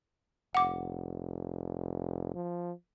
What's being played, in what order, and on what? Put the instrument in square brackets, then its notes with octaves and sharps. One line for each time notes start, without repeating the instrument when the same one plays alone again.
[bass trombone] F1 [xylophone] F#5 D6
[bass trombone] F3